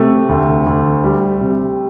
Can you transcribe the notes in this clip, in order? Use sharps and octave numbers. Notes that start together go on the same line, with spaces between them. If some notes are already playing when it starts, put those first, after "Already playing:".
Already playing: C3 A3
D2
D2
G3
C3